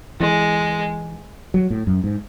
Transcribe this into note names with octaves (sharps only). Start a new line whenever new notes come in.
E3 G#3
F#3
A2
F#2
G#2